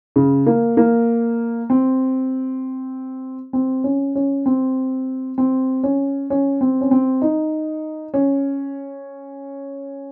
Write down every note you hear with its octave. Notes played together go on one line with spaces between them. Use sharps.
C#3
A#3
A#3
C4
C4
C#4
C#4
C4
C4
C#4
C#4
C4
C#4
C4
D#4
C#4